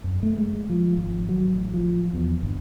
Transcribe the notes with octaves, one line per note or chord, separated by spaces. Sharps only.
F#2
A3
G#3
F3
G#1
F#3
A1
F3
E2
G1